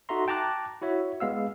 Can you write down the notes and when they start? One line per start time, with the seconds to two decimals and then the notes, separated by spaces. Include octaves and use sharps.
0.09 D#4 F#4 A4 E5 A#5 C6
0.28 G5 A5 A#5 D6 F#6
0.82 E4 F#4 C#5 E5
1.20 G#3 B3 F5 E6